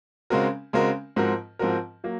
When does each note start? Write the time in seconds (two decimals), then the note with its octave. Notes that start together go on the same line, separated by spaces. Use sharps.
0.30 C#3 G#3 C4 F#4 A#4
0.73 C#3 G#3 C4 F#4 A#4
1.16 G#2 F3 C4 F#4 A#4
1.59 G#2 F3 C4 F#4 A#4
2.04 F#3 A#3